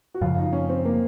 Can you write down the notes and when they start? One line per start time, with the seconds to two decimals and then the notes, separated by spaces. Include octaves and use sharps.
0.14 F#4
0.21 F#2 C#3 F3 F4
0.38 D#4
0.53 C#4
0.69 C4
0.85 A#3